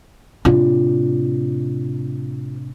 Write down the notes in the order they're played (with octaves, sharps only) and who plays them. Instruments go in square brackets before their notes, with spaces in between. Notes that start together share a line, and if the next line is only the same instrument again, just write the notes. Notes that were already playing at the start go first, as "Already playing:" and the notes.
[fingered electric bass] A2 C3 D4 [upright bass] F4